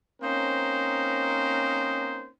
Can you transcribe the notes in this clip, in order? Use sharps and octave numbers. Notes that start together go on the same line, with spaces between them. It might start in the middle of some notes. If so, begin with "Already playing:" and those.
A#3 C4 C#4 D#4 A#4 C5